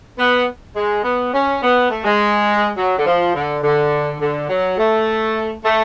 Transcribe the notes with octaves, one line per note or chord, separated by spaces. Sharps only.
B3
G#3
B3
C#4
B3
A3
G#3
F#3
D3
F3
D3
D3
D3
F#3
A3
A3